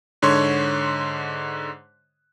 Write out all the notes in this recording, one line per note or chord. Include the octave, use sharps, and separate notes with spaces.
G#2 D3 C#5 C6